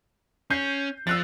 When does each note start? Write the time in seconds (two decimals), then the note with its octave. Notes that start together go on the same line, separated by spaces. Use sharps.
0.50 C#4 G6 C7
1.07 F3 E6 F#6 A6